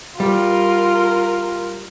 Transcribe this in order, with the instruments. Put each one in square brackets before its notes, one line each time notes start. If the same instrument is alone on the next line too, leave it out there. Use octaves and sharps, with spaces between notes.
[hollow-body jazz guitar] G3 [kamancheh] F4 A#4